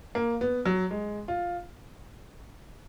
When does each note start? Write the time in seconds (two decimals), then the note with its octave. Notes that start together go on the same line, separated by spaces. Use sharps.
0.15 A#3
0.41 B3
0.65 F#3
0.91 G#3
1.28 F4